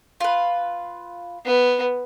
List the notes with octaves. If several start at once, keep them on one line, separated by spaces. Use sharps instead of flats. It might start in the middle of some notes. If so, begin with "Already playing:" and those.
F4 B4
B3